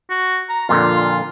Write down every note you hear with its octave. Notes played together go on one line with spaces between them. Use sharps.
F#4
A#5
F2 A#2 D3 F4